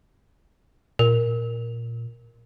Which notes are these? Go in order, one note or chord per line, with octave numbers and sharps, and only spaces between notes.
A#2 A#4